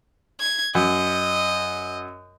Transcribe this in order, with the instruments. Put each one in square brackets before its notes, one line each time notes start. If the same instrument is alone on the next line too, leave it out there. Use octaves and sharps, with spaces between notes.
[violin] G#6
[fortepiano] F#2 [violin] D#5